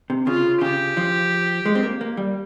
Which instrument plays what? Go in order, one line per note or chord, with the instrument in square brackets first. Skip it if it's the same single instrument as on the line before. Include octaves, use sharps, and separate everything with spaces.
[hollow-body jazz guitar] C3
[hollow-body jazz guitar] C#3 [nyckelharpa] F4
[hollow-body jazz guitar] C#3 [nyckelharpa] G4
[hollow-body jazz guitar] F3
G#3
C4
A#3
A#3
G3